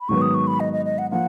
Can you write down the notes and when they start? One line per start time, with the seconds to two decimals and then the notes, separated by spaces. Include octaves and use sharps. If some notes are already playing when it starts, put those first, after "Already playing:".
0.01 B5
0.09 G#2 D#3 F#3 B3 C#6
0.22 D#6
0.34 C#6
0.47 B5
0.60 D#5
0.73 D#5
0.85 D#5
0.98 F#5
1.11 F3 A#3 F4 F#5